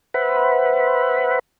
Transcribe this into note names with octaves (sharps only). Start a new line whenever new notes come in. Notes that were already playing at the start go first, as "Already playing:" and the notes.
B4 C5 E5 F#5 B5